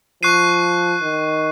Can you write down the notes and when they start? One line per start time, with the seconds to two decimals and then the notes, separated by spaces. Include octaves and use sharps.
0.22 F3 C#6 F#6 C7 D#7
1.02 D#3